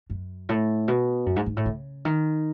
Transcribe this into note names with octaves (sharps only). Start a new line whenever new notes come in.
F#2
A2
B2
F#2
G#2
G#2
A2
C#3
D#3